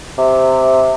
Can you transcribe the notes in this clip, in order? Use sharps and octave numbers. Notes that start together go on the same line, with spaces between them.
C3